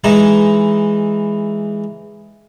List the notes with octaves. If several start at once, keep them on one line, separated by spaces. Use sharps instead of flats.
E3 G#3 D#4 E4